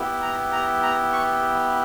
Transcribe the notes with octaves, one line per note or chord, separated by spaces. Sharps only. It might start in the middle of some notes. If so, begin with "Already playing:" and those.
Already playing: B3 E4 G4
A#5
A#5
A#5
C#6